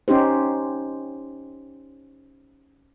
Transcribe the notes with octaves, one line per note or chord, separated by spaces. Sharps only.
C#4 D#4 G4 C5